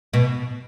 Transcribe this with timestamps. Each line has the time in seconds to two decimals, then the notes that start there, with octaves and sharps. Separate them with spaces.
0.13 B2